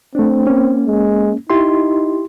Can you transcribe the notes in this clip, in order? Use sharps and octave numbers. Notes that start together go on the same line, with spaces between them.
A3 C4 D4
A#3 C#4
G#3
D#4 E4 G4 C6